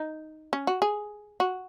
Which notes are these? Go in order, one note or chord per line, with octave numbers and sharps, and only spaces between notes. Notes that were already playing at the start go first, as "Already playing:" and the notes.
Already playing: D#4
C#4
F#4
G#4
F#4